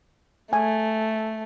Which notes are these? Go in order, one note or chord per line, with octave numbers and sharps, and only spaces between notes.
A3 G#5